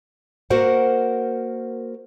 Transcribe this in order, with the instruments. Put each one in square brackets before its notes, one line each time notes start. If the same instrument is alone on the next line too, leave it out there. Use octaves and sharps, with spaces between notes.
[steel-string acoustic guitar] A#3 F#4 A#4 C5 F#5